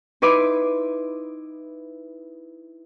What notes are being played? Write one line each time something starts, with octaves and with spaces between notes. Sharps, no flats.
D#4 E4 B4 C6 D6